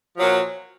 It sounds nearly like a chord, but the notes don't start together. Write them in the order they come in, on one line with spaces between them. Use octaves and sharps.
F3 F#3 A#2